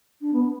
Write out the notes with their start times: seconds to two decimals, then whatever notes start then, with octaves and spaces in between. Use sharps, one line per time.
0.21 D4
0.33 B3